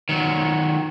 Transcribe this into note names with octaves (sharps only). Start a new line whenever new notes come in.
D#3 F#3